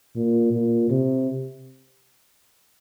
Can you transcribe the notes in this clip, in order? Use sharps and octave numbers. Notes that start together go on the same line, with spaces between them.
A#2
A#2
C3